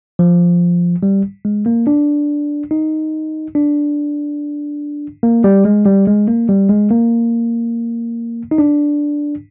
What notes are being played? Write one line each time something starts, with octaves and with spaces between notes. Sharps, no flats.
F3
G3
G#3
A#3
D4
D#4
D4
A#3
G3
G#3
G3
G#3
A#3
G3
G#3
A#3
D#4
D4